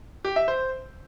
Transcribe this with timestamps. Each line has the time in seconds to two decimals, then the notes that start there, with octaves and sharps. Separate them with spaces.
0.25 G4
0.36 E5
0.48 C5